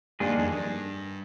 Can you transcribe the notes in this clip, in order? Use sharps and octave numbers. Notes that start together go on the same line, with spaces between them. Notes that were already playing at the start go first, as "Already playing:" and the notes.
G2 D#3 A#3 D4 F4 G#4
F2
G2